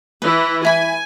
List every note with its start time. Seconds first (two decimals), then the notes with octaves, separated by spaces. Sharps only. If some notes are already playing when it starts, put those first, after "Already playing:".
0.22 E3 E4 B4
0.65 E4 G#5 B5